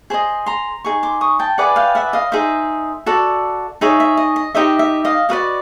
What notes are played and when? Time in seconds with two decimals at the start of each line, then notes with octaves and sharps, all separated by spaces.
0.10 G#4 C5 D#5
0.46 A#5 C6
0.84 D#4 G#4 C#6
1.03 C6 D6
1.21 C#6 D#6
1.39 G5 A5
1.58 E4 G#4 B4 D5 F#5 G#5
1.76 F5 G5
1.95 E5 F#5
2.13 D#5 F5
2.32 D#4 G#4 C5 E5
3.06 F#4 A4 D5
3.81 D#4 G#4 C#5 E5
4.00 E5
4.17 D#5
4.36 D#5
4.55 D#4 G4 C5 D#5 E5
4.79 E5
5.05 D#5 F5
5.29 F#4 B4 D5 D#5 F5